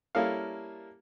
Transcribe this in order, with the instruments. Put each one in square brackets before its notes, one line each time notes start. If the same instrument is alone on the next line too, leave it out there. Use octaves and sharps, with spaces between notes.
[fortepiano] G3 A#3 C#4 E4 A4 F5